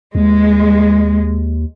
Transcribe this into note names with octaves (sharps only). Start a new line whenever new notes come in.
D#2 G#3